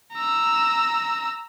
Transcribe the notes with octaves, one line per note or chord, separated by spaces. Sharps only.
A#5 E6